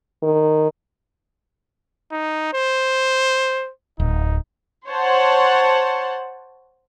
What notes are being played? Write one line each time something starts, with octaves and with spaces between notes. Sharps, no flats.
D#3
D#4
C5
D1 D#4
C5 C#5 F#5 A5